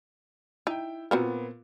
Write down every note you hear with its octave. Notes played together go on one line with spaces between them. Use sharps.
D#4 E4 G5
A#2 B3 C4 F#4 A#4